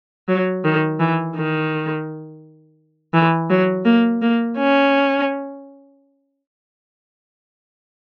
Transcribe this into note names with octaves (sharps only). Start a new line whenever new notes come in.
F#3
D#3
E3
D#3
E3
F#3
A#3
A#3
C#4